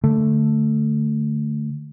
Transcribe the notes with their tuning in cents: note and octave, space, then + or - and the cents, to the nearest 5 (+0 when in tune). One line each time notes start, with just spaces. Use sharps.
D3 +0 A3 +0